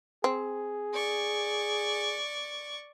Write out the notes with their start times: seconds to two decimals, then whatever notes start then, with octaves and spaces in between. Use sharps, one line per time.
0.24 C4 G#4
0.93 D5 C#6